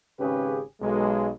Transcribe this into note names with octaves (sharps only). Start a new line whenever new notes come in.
G#1 C#3 C#4 G4 G#4 B4
B1 G#3